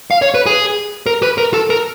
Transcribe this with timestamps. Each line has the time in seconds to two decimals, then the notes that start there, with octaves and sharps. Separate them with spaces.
0.11 F5
0.22 C#5
0.34 B4
0.46 G#4
1.06 A#4
1.23 B4
1.38 A#4
1.54 A4
1.70 A#4